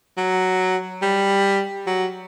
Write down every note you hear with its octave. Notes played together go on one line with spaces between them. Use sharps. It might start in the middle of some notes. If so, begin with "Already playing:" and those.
F#3
G3
F#3